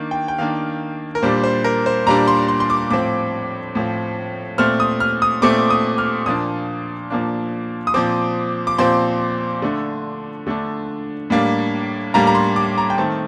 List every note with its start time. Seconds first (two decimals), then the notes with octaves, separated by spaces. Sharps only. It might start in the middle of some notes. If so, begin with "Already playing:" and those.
Already playing: D#3 A#3 D4
0.11 G5
0.28 G5
0.38 D#3 A#3 D4 F5
1.15 A#4
1.22 A#2 G3 D4 C5
1.44 C5
1.64 A#4
1.86 C5
2.06 A#2 G3 D4 A#5
2.27 C6
2.48 C6
2.60 C6
2.70 D6
2.90 A2 F3 C4 D6
3.75 A2 F3 C4
4.58 A#2 A3 C4 F6
4.80 D#6
5.00 F6
5.22 D#6
5.42 A#2 A3 C4 D6
5.70 D#6
5.98 F6
6.26 A#2 F3 A#3 D4 D#6
7.10 A#2 F3 A#3 D4
7.87 D#6
7.94 A#2 F3 C4 D6
8.67 D6
8.78 A#2 F3 C4 C6
9.62 D3 A3 D4
10.47 D3 A3 D4
11.30 A2 G3 A#3 D4
12.14 A2 G3 A#3 D4 A#5
12.27 A#5
12.35 C6
12.56 D6
12.78 A#5
12.90 G5
12.98 D#3 A3 C4 A5